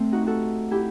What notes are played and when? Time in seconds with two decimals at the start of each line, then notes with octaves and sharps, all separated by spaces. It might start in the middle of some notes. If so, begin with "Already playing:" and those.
Already playing: A3 C4
0.12 D#4 F#4
0.27 F#4 A4
0.71 E4 G4